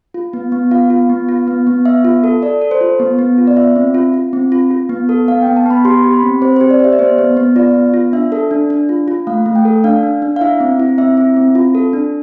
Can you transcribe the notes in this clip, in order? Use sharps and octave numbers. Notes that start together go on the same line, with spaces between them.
F4
B3
B3
F4 F5
F4
B3
F4
B3
B3
B3 E5
F4
A4
A4 D5
A4
C5
F4
B3
B3
F4
D5
F4 E5
C4
F4
F4
C4
F4
F4
B3
A4
B3 F5
G5
B3
A5
B3 B5
G4 C6
G4
B5
C4
C4 C5
C5
G4
D5
G4 E5
D5
B3 C5
B3
B3
F4 D5
B3
F4
D4 E5
A4
D4
D4
F4
F4
A3 F5
A3
G5
A4
D4 F5
D4
D4
F5
E4 E5
C4
E4
C4 E5
E4
C4
F4
A4
D4